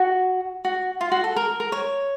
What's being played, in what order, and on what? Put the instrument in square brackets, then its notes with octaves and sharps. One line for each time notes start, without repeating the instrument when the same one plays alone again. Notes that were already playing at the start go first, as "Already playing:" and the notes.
Already playing: [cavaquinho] F#4
F#4
F4
F#4
A4
A#4
A#4
C#5